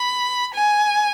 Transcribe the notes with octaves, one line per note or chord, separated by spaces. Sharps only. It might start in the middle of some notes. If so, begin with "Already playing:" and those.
Already playing: B5
G#5